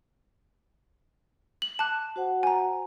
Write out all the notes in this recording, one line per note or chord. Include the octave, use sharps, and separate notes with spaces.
F#7
A5 D6 F#6
F#4 C5 F#5
G#5 A#5